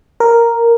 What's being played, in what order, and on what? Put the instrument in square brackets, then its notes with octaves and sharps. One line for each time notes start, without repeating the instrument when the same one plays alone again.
[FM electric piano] A#4